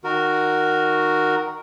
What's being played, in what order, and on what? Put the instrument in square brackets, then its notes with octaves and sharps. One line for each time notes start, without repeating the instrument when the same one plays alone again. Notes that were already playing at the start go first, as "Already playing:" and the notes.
[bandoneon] D#3 F#4 A#4